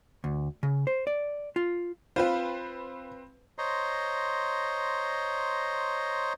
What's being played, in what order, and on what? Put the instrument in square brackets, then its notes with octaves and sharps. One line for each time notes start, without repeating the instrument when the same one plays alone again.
[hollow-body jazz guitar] D2
C#3
C5
D5
F4
[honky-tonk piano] C4 B4 C5 [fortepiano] F4
[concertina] C5 C#5 D#5 A#5 C6